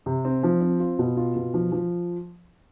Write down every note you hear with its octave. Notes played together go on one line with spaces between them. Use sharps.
C3
C4
F3
C4
F4
B2
F4
B2
F3
F3